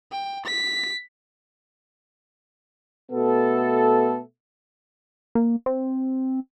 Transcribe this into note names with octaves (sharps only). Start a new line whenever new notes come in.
G5
B6
B2 A3 B3 A4
A#3
C4